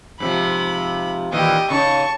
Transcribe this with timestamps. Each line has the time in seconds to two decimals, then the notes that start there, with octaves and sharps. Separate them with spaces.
0.20 G#2 C3 F3 B5
1.32 A#2 D#3 E3 G4 D#5
1.70 C#3 D#4 A5 C#6